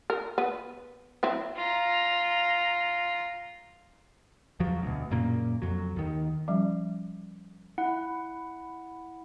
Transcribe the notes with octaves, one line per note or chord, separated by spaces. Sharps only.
A#4
B3
F#3 C4 E4
F4 A#5
E2 F3 F#3
D2 B2
F#2 A#2 C#3 A#3
F2 F#3
D#2 D#3
F3 G3 C#4
E4 F#5